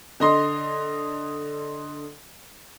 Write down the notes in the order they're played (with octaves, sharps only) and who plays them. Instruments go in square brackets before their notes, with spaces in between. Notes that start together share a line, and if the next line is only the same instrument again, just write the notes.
[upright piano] D3 D#5 C6